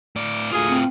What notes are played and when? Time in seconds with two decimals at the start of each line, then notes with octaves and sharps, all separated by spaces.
0.16 A2 D5
0.52 D2 A2 F4 G#4
0.68 C4